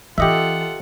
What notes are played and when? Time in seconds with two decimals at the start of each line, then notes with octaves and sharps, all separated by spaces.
0.18 E3 C#4 F4 G4 A4 D#5 E5 F#5